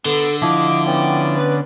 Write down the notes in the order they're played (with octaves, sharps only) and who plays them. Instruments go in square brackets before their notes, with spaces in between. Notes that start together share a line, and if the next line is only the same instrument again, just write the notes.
[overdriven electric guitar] D3 [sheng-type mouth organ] B3 [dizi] A4
[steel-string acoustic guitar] F3 E4 [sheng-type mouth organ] D#5 [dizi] D6
[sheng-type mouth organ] B3 C#4 D5 [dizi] G5
[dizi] B4